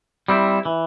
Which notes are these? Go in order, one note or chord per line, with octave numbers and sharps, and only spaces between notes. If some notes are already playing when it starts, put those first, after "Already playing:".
G3 C4 E4
E3